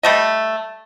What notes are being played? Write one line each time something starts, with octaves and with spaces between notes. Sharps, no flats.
G3 A3 D#5